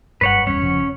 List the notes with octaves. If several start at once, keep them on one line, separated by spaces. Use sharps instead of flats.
F#1 G2 B4 C#5 F#5
D#1 E2 G3 C#4 C#5
F1 C#3 F3